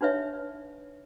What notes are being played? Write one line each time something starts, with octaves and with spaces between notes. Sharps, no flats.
D4 D#4 B4 C#5 E5